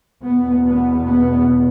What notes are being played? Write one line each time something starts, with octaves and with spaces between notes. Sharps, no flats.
E2 B2 B3
B3
B3